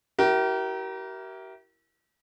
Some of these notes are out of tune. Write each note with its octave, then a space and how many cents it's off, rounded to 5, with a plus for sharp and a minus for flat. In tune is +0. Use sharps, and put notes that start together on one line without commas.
E4 +0 G4 -40 A#4 +15